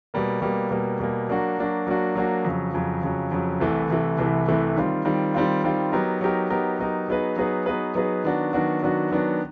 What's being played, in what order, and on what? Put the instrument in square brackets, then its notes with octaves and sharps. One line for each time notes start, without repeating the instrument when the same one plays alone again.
[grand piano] B2 G3 A#3
B2 G3 A#3
B2 G3 A#3
B2 G3 A#3
F#3 A#3 D4 F#4
F#3 A#3 D4 F#4
F#3 A#3 D4 F#4
F#3 A#3 D4 F#4
F2 C#3 F#3
F2 C#3 F#3
F2 C#3 F#3
F2 C#3 F#3
C2 C3 E3 A3
C2 C3 E3 A3
C2 C3 E3 A3
C2 C3 E3 A3
D#3 G3 C4 F4
D#3 G3 C4 F4
D#3 G3 C4 F4
D#3 G3 C4 F4
F#3 B3 D#4 G4 A#4
F#3 B3 D#4 G4 A#4
F#3 B3 D#4 G4 A#4
F#3 B3 D#4 G4 A#4
F#3 B3 D#4 G#4 B4
F#3 B3 D#4 G#4 B4
F#3 B3 D#4 G#4 B4
F#3 B3 D#4 G#4 B4
D#3 F#3 B3 D4 F#4
D#3 F#3 B3 D4 F#4
D#3 F#3 B3 D4 F#4
D#3 F#3 B3 D4 F#4